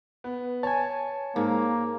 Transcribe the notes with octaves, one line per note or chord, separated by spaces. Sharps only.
B3
C#5 G#5 A5
G#2 A#3